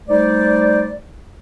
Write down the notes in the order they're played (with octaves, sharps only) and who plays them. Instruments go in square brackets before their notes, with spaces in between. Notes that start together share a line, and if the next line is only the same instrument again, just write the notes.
[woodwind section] G3 A3 D#4 C5 D5